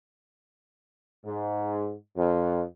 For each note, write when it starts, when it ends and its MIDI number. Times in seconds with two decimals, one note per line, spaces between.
1.25 1.94 44
2.17 2.63 41